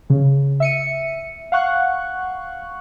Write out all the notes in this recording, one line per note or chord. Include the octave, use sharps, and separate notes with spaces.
C#3
E5 C#7 D#7
F5 F#5 C#6 F#6